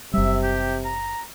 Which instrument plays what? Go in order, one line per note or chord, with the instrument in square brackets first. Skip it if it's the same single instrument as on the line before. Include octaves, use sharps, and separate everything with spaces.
[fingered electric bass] F#1 G3 [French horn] C3 [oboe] E5
[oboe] G4
A#5